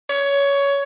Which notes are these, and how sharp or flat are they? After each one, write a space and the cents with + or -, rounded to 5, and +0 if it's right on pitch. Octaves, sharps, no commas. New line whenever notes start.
C#5 +15